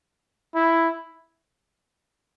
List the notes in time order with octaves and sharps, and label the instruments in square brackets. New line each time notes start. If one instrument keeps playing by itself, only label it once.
[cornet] E4